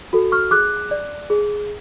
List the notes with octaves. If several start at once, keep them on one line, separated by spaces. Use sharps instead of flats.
F#4 A4
C#6 F6
G#4 D6 F#6
D5
G#4